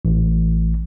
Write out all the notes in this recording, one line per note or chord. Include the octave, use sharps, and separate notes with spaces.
A1